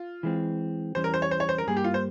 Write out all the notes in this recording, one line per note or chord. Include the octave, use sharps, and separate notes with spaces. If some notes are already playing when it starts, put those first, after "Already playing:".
Already playing: F4
E3 G#3 C4
E2 E3 G3 C#4 C5
A#4
C5
C#5
C5
C#5
C5
A#4
G2 G3 A#3 G#4
G4
F4
C5